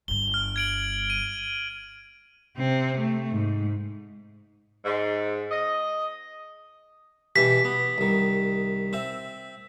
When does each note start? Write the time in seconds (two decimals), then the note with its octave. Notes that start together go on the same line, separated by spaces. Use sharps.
0.08 G1 G2 G7
0.34 F6
0.56 G#6 D7 F#7
1.10 D#7
2.57 C3 C4
2.98 A3
3.32 G#2
4.85 G#2
5.50 D#5
7.36 B2 E3 G4 B6
7.65 B3
7.98 C2 D#3
8.93 C4 E5